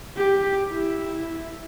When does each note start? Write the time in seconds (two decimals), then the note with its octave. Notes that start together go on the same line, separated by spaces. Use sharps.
0.17 G4
0.71 E4